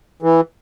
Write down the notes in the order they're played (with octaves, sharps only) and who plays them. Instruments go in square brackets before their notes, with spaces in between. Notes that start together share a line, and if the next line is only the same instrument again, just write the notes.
[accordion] E3